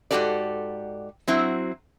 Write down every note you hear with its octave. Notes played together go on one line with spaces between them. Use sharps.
G#2 E3 F#4 G4 A4 D5
F#3 C4 E4 F#4